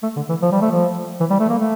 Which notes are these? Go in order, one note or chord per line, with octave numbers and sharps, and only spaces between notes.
A3
D3
E3
F3
G3
A3
F3
E3
G3
A3
A#3
A3